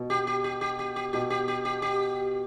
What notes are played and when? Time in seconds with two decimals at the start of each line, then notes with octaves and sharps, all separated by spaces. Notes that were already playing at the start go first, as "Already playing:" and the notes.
Already playing: B2
0.10 G4
0.27 G4
0.44 G4
0.61 G4
0.79 G4
0.96 G4
1.13 B2 G4
1.30 G4
1.48 G4
1.65 G4
1.82 G4